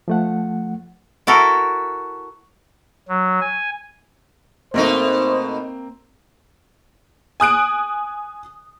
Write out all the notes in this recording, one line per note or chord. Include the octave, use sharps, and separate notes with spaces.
F3 A3 F#5
E4 F#4 A4 A#4
F#3
G#5
B2 A3 A#3 C4 D#4 C5
G#5 D#6 F#6 D7